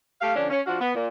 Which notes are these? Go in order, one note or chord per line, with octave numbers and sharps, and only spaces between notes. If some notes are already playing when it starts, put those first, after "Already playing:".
A3 G4 F5
D3 F3 C#4 D4
C#4
F3 D4 F#4 F5 F#5
B3
A#2